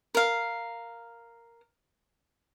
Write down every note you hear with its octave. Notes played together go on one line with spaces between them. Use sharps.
A#4 F5